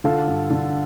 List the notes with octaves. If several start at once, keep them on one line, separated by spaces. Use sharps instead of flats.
D3 F4 A4
G2
D3